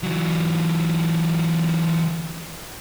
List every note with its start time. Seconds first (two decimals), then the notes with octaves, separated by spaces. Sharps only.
0.03 E3 F#3